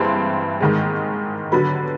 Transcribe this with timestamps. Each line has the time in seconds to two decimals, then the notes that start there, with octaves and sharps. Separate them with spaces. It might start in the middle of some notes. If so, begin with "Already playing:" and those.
Already playing: G2 E3 G#3 C4 C6
0.60 G#2 D#3 G#3
1.52 D3 F#3 B3 B5